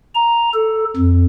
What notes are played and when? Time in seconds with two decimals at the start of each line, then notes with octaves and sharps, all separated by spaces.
0.15 A#5
0.54 A4
0.97 F2